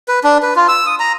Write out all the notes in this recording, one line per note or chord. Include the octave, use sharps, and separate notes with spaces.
B4
D4
B4
F4
E6
D#6
A#5